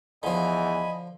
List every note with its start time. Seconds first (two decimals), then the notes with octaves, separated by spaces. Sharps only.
0.23 E2 D3 F3 D#5 G#5 B5